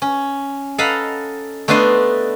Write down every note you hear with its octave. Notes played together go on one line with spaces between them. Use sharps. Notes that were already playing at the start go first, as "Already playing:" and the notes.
C#4
A4 D#5 F5 F#5 A#5 B5
A3 B3 D4 D#5 C6